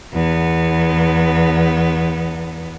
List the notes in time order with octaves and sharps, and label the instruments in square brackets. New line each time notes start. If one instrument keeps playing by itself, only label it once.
[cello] E2 B3